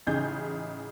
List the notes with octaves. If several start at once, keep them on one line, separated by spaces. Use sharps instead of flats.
A1 C#3 D#4 G#4 G6